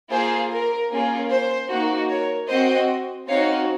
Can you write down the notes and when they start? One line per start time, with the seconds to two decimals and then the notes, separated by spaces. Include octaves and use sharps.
0.10 A#3 F4 G#4 C5
0.51 A#4
0.90 A#3 C#4 F4 G#4
1.30 C5
1.69 A#3 D#4 F#4
2.09 A#4 C#5
2.48 C4 F#4 C5 D#5
3.28 C4 D#4 F#4 C#5 F5